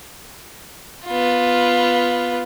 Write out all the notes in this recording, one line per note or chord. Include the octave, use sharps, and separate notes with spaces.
B3 F4